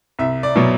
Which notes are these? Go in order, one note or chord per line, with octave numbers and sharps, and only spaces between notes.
C2 E5
D5
B2 F#3